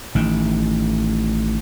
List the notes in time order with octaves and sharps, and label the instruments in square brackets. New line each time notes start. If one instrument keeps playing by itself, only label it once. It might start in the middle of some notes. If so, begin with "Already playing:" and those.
[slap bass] A1 D#3